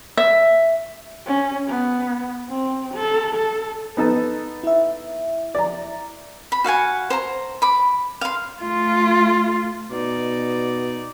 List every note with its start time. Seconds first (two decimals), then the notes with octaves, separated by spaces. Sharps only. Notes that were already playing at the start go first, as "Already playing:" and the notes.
0.17 E5
1.26 C#4
1.68 B3
2.49 C4
2.94 A4
3.35 A4
3.97 B3 D#4 A4
4.64 E4 E5
5.55 D5 A#5
6.52 B5
6.64 F#4 F5 F#5 G#5
7.10 C5 A#5
7.62 B5 D6
8.21 F5 C6
8.62 A3 F4
9.91 B2 D#4 D5